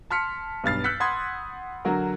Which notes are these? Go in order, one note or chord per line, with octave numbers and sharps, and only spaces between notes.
A5 C6 F6 B6 C#7
B1 G2 F6 A6 C7
E6 F#6 G6 B6 C#7
F#5 B5 C6 D#6 G#6
D3 F#3 F#4 A#4